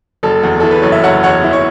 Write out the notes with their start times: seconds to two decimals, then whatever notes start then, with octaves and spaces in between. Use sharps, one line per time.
0.23 F#1 A4
0.43 E2
0.60 E3 A4
0.71 B4
0.82 F#1 C#5
0.92 E5
1.03 F#1 C#5 F#5
1.23 E2 C#5 F#5
1.44 E3 E5
1.53 C#5